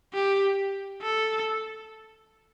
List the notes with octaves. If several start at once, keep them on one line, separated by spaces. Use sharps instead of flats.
G4
A4